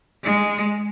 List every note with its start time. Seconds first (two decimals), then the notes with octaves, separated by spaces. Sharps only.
0.23 G#3